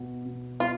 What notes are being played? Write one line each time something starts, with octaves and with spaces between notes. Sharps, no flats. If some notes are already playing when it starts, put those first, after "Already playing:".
Already playing: B2 B3
B2
B3 F4